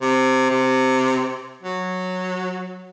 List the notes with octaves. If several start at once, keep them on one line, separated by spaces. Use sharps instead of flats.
C3
C3
F#3